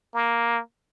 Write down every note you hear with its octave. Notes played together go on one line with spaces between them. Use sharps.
A#3